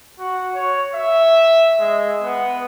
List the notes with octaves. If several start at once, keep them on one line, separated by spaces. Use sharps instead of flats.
F#4
C#5
E5
G#3
B3